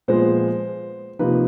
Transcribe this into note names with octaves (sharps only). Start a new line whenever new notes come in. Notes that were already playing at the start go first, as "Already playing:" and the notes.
A#2 F3 G#3 B3 C5
C3 F3 A#3 D#4 B4